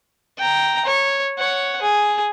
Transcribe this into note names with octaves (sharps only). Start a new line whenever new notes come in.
G5 A#5
C#5
C#5 F#5
G#4